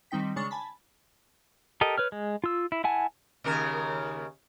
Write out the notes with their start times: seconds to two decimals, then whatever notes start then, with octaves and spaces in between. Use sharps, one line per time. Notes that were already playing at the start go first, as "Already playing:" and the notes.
0.11 D#3 G3 C4 D#4 G5 B6
0.36 C#3 G#3 D4 C#6 A6
0.51 G#5 A5 B5
1.81 G4 A4 A#4 D#5
1.98 B4 C#5 F6
2.12 G#3
2.44 F4 E6
2.72 E4
2.84 E4 F#5 G#5 A5
3.44 D#2 C#3 A#4